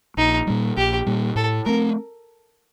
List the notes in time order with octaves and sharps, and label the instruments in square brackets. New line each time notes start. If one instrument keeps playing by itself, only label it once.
[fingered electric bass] A#1 [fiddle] D#4
[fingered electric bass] A#2 G3
[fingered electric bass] A#1 [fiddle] G4
[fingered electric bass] A#2 G3
[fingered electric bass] A2 [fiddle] A4
[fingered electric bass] A3 C4 [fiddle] A#4